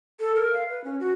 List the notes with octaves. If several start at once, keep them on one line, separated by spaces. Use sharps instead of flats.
A4
A#4
F5
B4
C#4
F#4